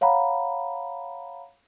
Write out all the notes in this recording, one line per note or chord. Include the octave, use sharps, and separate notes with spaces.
C#5 F5 F#5 A#5 B5